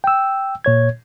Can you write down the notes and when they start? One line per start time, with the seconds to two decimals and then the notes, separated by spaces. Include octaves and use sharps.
0.04 G5 E6
0.65 A#2 C#5 G#6